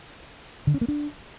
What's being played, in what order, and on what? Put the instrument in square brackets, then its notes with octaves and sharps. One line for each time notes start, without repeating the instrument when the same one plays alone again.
[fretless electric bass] D3
C#4
A#3
D4